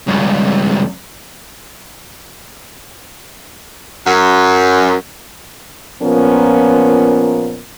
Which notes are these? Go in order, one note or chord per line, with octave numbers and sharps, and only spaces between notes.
C#2 G2
F#2
A#2 F3 B3 C#4 A#4